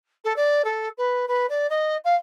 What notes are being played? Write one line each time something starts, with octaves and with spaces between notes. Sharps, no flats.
A4
D5
A4
B4
B4
D5
D#5
F5